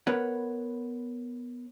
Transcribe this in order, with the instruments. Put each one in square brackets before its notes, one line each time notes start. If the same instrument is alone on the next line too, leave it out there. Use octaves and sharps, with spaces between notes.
[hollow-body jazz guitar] B3 A#4 B4 C#5 F#5